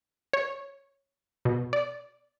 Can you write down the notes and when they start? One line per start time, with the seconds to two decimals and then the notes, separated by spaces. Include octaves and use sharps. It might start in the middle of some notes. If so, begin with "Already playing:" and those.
0.33 C#5
1.45 B2
1.73 D5